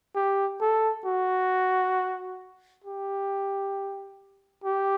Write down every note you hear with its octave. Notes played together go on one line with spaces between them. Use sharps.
G4
A4
F#4
G4
G4